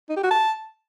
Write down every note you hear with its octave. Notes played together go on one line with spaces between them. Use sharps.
D#4
G4
F#4
A5